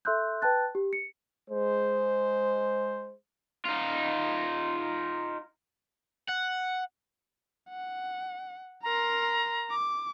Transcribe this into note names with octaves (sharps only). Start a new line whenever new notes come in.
A4 E5 C6 E6 F#6 G6
B4 G5 A5 F#6 A6
G4
C#7
G#3 C5
D#4 F4
F#5
F#5
A#4 A#5 C6
D6